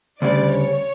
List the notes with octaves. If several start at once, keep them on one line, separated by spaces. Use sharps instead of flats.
D2 C#3 G3 D5
C#5